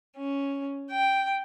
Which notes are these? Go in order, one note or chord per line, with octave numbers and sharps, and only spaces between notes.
C#4
G5